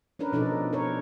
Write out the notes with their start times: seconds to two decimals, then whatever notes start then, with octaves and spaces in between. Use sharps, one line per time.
0.19 C#4 D4 A#4 B4
0.32 B2 F3 D4 D#4 A4 D5
0.73 A#4 C#5